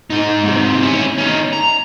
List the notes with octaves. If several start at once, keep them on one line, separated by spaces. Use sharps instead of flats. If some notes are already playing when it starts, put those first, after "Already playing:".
G#2 D#4
G#2 C3
C#4 E4
C#4 D#4
A#5